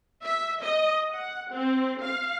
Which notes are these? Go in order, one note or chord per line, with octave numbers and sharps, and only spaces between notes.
E5
D#5
F#5
C4
F5